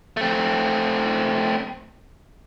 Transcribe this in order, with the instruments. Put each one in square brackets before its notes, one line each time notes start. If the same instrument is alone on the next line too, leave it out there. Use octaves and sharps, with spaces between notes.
[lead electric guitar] A3 C4